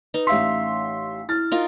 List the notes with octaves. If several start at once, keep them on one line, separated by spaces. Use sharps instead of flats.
D#4 B4
A1 E5 F5 C6 E6 B6
E4 F6 A6
D#4 F4 A#4